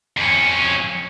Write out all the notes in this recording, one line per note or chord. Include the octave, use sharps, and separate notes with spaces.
F2 C#4